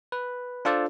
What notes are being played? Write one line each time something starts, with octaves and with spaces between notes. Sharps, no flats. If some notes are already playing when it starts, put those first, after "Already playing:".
B4
D4 F4 A4 C5 D5